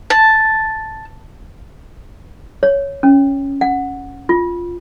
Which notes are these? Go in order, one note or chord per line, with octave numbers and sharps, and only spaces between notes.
A5
C#5
C#4
F#5
F4